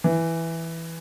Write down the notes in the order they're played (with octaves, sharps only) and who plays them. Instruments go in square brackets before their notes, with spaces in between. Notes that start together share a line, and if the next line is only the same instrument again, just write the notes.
[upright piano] E3